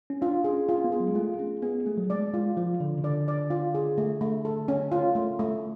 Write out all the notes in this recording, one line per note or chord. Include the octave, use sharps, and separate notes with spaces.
C#4
D4 F4
G#4
C#4
F4
B3
G#4
F#3
G#3
A3 F4
C#4 G#4
B3 G#4
A3 G#4
F#3
G#3 D5
G#3 F4
F3 F4
D3 D5
C#3
D3 D5
D5
F4
G#4
A3
A3
A4
C#4
F4
A3
A3